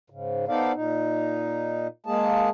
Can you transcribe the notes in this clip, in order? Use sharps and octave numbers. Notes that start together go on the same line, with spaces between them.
G#2 C#3
B3 D#4 A4 C5 D5 F5
A#2 D#4
G#3 A#3 G#4 A5